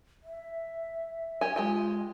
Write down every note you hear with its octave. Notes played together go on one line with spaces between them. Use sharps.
E5
G4 G#5
G#3 F4 G4 G#5